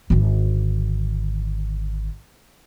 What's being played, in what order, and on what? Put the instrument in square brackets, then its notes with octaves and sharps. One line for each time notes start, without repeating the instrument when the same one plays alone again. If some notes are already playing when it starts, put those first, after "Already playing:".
[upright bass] G#1 D3